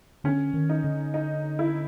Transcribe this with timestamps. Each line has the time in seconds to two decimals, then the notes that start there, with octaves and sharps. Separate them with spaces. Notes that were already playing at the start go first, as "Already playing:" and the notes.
0.24 D3 C#4
0.54 D#3
0.69 D#4
0.84 D3
1.14 D#4
1.59 E4